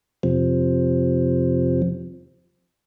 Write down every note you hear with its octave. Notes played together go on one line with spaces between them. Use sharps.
F2 C3 F3